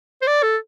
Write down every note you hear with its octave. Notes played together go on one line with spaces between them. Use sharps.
C5
D5
A4